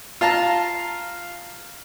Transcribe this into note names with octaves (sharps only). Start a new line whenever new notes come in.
F4 F5 A5 A#5